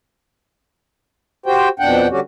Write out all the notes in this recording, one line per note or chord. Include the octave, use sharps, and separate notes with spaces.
F#4 G4 C5 G5
F2 B2 D4 F#5 G5
D3 G3 C#4 F#4 G4